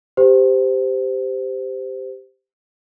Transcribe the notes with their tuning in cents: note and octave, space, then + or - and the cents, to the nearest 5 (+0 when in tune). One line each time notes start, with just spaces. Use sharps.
G4 +0 C5 -20